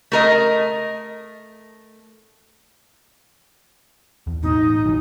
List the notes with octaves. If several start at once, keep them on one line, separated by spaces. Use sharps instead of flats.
A3 A#4 D#5
E2
A1 B2 D#4
D#2 E3 F#3